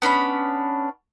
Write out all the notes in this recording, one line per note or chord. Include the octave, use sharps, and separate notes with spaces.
B3 C#4 D4 B5